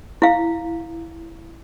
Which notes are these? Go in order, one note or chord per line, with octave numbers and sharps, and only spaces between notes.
E4 F5